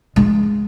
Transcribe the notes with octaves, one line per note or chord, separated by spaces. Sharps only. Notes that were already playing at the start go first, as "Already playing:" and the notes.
G#3